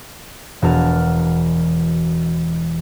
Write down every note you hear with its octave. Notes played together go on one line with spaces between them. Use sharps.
E1 F#4 A#4 A5 F6